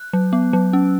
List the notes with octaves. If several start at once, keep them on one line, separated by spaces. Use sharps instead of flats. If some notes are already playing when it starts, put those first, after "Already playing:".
Already playing: F#6
F#3
B3
F#3
C#4